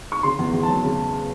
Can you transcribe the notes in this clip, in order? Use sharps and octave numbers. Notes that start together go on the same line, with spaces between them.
C#6
C#3 C6
E2
E2
F#3 A5
C#3